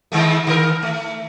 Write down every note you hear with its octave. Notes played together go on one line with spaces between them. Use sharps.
D#3 G#3 A3
D#3 A#4
A3